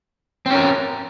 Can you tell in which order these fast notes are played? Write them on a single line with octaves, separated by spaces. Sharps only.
C4 C#4 A#4